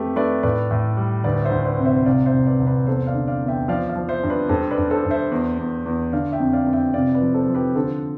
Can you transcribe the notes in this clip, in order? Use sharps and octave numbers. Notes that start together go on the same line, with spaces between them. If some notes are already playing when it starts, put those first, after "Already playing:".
Already playing: F2 A3 G4 B4 E5
A3 B4 D5
A2 B4 D5
A2
G3
D2 B4 D5
C5 E5
D2
B4 D5
C3
C5 E5
C2 D5 F5
C5 E5
C2
B4 D5
C2
B4 D5
E2 A4 C5
D5 F5
D3
D5 F5
E2
E5 G5
F3 D5 F5
D5 F5
F3
C5 E5
G2
B4 D5
G2 A4 C5
B4 D5
G2
A4 C5
G2
C5 E5
E2
E2
E2
D3 D5 F5
E5 G5
F2
D5 F5
F2
E5 G5
C3 D5 F5
B4 D5
F3
A4 C5
F3
G4 B4
D3 A4 C5